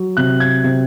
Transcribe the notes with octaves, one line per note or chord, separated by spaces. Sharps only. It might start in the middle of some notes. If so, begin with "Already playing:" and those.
Already playing: F#3
C3 F#6
G#6
C3